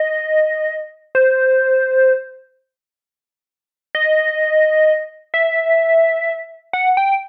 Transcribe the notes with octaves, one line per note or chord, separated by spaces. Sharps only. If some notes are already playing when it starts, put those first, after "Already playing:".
Already playing: D#5
C5
D#5
E5
F#5
G5